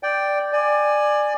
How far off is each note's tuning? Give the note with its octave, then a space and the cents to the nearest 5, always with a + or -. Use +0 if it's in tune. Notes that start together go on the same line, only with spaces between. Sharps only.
D5 +0 G5 +0
D5 +20 G#5 +0